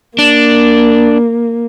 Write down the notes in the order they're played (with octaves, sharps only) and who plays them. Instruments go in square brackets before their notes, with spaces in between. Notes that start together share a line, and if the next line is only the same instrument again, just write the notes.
[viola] A#3 [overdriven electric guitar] D4